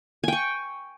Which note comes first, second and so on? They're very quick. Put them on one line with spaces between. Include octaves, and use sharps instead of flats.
G#5 G5 C#6